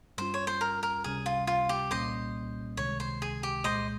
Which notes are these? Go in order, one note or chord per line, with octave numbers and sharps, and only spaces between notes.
G2 G3 C#4 F4 C5
C#5
C5
A#4
A#4
C#2 C3 G3 C#4 G#4
F4
F4
G4
C2 A#2 G3 A#3 C#4 C5 D#5
C#2 C3 D#3 G#3 C#5
C5
G#4
G4
C2 A#2 G#3 C5 D#5